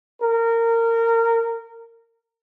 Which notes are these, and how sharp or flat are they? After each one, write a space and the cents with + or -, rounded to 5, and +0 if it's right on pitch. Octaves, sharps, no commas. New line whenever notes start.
A#4 -20